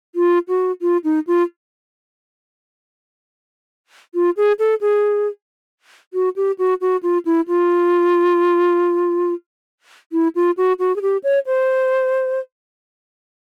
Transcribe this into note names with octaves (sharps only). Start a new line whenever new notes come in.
F4
F#4
F4
D#4
F4
F4
G#4
A4
G#4
F#4
G4
F#4
F#4
F4
E4
F4
E4
F4
F#4
F#4
G#4
G4
C#5
C5